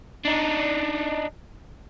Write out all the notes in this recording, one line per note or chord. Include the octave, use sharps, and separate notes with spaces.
D4 D#4